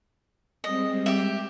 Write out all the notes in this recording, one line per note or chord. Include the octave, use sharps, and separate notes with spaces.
G3 G#3 C4 D#5
G4 E5